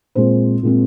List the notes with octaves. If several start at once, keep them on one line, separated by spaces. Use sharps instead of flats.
A#2 G#3 C4 C5
A#2 G#3 C4